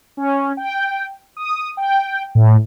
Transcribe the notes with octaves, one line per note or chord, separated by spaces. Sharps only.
C#4
G5
D#6
G5
A2